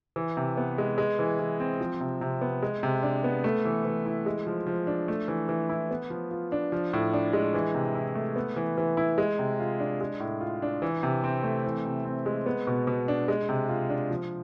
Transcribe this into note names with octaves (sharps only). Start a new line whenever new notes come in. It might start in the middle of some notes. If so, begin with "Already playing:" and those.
E3
C3
B3
G#3
G#3
E3
E3
C4
F3
C3
C3
B3
G#3
C3
D4
B3
A3
E3
E3
E4
G#3
F3
F3
D4
A3
E3
E3
E4
B3
F3
F4
D4
F3
A2
D4
G#3
E3
C3
E4
A3
B3
E3
E3
E4
G#3
C3
F4
D4
G#3
A2
F4
D4
E3
C3
C4
A3
E3
C3
C4
G#3
B3
B2
B2
D4
G#3
C3
F4
D4
F3